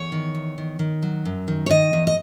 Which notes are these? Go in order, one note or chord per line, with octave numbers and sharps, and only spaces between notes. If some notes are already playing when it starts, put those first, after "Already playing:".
Already playing: E2 C#5
D#3
E2
D#3
D#3
F#3
F#2
D#3
C#5
D#3 D#5
E2
D#5